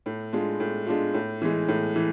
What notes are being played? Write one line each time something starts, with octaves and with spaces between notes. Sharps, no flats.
A2
G#3 D4 F4
A2
G#3 D4 F4
A2
E3 G#3
A2
E3